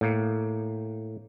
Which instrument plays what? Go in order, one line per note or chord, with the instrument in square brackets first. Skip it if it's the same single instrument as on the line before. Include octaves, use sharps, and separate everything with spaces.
[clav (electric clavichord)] A2 A#3